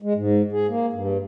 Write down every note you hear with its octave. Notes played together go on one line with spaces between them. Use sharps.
G#3
G#2
G#4
A#3
G2